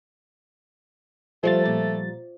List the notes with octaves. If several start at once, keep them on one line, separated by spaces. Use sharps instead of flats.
F3 G3 A3 C5 C#5 F5 A6
A#2